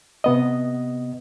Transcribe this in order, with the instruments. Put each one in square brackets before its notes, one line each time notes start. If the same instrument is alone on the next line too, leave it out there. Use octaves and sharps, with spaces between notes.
[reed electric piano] C3 B3 D#5